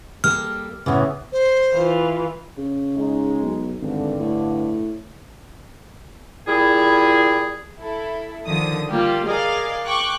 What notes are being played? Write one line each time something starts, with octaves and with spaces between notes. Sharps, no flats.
G3 A#3 A4 F6
A2 C#3 E3 B3 C#4
C5
E3 F4
C#3
G#3 D#4
B1
G#1 G2 D3
A2
A#2 G3 E4 G#4
E4 A4
D3 D#3 F3 D#6
G3 A#3 F4 G4
G#4 A#4 D5 D#5 F5
G5 C#6 D6 F#6